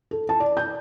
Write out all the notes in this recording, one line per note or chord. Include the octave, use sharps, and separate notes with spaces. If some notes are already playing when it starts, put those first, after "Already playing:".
A4
A5
D5
G6